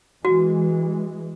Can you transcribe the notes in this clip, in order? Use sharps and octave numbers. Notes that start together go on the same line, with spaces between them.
E3 G#3 F#4